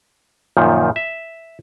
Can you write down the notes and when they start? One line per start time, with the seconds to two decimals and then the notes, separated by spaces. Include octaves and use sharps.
0.57 F#2 A#2 D#3 F3
0.96 E5